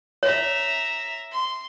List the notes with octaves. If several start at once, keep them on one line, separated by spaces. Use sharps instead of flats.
C#5 E5 A#5
C6